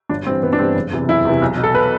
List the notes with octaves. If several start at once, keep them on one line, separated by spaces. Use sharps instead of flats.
G1 D4
G2 E3 C4
G1 B3
D4
G2 E3 C4
F#1
E2 C3 E3
F#1 E4
E2 C3 E3
B1
B2
A4
B4